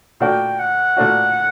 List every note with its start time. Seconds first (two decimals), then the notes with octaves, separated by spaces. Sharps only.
0.21 A#2 A3 D4 F#4 G5
0.59 F#5
0.97 A#2 A3 D4 F#4